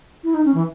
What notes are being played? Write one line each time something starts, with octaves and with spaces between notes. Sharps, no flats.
E4
D#4
C#4
E3